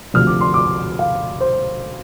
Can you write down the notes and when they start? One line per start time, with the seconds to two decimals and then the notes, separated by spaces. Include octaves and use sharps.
0.14 D2 C3 F3 F6
0.27 D6
0.41 C6
0.54 D6
0.99 F5
1.41 C5